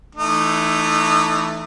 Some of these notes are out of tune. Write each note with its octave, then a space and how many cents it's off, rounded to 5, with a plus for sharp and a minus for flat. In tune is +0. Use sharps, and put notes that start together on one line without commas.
E3 +0 A3 +5 D#4 -25